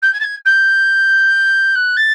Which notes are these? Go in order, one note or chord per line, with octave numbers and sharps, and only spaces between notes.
G6
G#6
A6
G#6
G6
F#6
A6